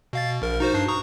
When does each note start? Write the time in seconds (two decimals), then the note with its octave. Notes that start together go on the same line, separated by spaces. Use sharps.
0.13 B2 F5 A6
0.30 B2
0.42 A#1 A#4
0.60 D#4 F#4 C5
0.74 G2 D4 C7
0.88 A#5 C#6 D#6